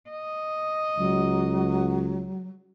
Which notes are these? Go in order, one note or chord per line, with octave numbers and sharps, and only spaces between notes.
D#5
C#2 F#3